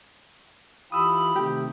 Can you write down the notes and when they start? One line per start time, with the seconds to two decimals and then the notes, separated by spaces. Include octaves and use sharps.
0.92 E3 F4 G4 B5 D#6 E6
1.35 C3 D#3 A3 G4